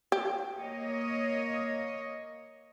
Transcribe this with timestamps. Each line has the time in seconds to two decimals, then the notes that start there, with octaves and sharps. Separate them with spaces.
0.12 G4
0.58 A#3 C#5 D#5